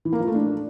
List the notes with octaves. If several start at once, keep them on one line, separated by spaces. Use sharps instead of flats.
E3
A#3
F3
A3
D4